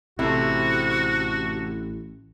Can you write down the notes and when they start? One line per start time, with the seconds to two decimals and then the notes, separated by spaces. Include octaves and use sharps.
0.19 A1 C3 A3 C4 E4 F#4 A4